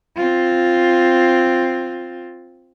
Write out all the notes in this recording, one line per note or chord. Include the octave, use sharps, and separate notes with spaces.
C4 F4